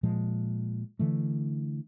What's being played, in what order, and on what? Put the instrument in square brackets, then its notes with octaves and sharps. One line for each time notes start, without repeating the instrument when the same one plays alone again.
[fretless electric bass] A#2 F3 G#3
D3 E3 A3